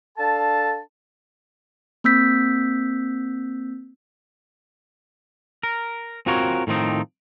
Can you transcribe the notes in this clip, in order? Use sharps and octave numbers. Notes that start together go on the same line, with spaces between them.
D4 A4 F5 A5
A#3 C4 E6 G6 B6
A#4
C4 F4 F#4 A#4 C#5
A2 D#3 F3 C4 D#4